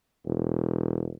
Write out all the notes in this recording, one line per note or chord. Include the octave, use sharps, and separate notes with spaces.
E1